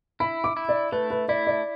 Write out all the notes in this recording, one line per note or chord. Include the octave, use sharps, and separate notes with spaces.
E4 B5
D6
E4
D5
A3 B4
B4
E4 D5
D5